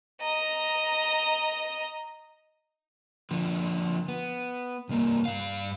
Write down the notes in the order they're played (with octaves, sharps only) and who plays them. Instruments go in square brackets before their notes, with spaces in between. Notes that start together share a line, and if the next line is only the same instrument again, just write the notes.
[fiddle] D#5 A#5
[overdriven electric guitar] D3 F3
B3
C2 A#3
G2 F5